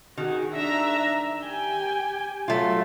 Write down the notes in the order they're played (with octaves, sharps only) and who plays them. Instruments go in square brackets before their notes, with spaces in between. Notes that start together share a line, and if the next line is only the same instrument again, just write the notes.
[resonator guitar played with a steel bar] D#3 [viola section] F#4 G#4
[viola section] D4 E5 A#5
G4 G5 G#5
[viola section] F#3 [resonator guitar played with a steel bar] A3 F4